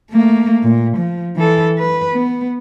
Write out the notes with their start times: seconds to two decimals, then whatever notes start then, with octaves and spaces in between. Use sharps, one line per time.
0.11 A3 A#3
0.64 A#2
0.97 F3
1.36 E3 A4
1.78 B4
2.13 B3